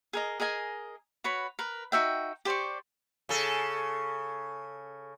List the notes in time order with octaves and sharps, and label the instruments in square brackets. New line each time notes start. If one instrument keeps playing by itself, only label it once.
[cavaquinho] G#4 A#4 D#5
G#4 A#4 D#5 G#5
F#4 B4 C#5 B5
A#4 B4
D#4 F#4 E5 G5
G4 C5 D5 C#6
[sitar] C#3 A4